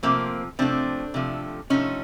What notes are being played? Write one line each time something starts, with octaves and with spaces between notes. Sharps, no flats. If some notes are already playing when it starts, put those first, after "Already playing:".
C3 F3 A3 A#3 C4
C3 F3 A3 C4 D4
C3 F3 A3
C3 F3 A3 C#4 D#4